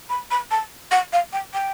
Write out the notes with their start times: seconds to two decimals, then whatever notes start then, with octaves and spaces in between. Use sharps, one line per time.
0.09 B5
0.31 B5
0.51 A5
0.91 F#5
1.13 F5
1.33 G5
1.54 G5